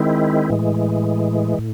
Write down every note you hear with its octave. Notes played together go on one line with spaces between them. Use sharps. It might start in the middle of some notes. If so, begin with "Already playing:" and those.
Already playing: D#3 G#3 C4 E4
A2 E3 G#3
A2